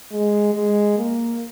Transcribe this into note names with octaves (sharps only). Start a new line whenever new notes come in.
G#3
G#3
A#3